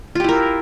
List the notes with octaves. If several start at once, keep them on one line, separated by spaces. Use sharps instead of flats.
E4 F4 G4 A#4